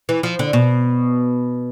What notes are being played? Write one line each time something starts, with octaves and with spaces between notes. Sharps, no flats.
E3
F3
D3
B2